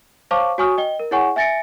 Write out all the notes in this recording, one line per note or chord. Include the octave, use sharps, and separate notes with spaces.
C5 C#5 F5 A5 C#6 D6
F#4 C#5 G#5 C#6 D#6 F6
D#5 G5 G7
A#4
E4 G#4 C#5 F#5 G#5 C#6
E5 G#5 A6 A#6 C#7 D7